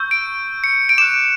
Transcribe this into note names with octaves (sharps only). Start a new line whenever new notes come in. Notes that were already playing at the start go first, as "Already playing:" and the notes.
Already playing: C#6 E6 G6
D7
C#7
D7
D6 F#6 E7